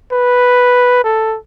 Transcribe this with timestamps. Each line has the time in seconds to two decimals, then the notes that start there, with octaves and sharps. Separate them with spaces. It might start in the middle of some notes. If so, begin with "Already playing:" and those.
0.12 B4
1.04 A4